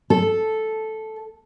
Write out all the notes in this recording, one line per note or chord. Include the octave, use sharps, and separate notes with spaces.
A4